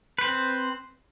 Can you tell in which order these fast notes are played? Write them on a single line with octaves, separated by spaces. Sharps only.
B4 C5 C4